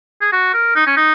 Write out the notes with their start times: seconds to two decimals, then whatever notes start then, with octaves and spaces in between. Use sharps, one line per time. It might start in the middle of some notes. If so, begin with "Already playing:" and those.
0.21 G#4
0.32 F#4
0.54 A#4
0.76 D#4
0.87 C#4
0.97 D#4